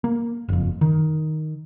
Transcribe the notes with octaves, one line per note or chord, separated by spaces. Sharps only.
A#3
F#1 F2
D#3